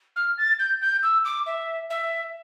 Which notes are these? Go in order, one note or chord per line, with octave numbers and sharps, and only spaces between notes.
F6
A6
G6
G6
E6
D6
E5
E5